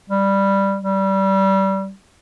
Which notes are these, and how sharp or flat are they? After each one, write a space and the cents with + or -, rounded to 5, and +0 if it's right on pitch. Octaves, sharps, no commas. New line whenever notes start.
G3 +5
G3 -20